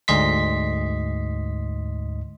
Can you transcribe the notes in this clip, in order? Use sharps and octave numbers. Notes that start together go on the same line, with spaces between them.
D2 G#2 D#5 C6 B6